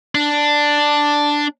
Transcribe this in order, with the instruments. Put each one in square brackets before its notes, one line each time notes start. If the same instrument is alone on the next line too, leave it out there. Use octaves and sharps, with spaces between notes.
[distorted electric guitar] D4